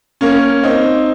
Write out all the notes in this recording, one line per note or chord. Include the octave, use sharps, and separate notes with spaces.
A#3 C#4
C4 D#4